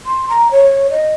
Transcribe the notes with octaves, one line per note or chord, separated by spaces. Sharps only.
C6
A#5
C#5
D#5